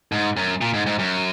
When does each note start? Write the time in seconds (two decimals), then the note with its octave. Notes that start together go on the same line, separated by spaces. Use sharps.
0.12 G#2
0.37 F#2
0.61 A#2
0.74 G#2
0.86 G#2
0.99 F#2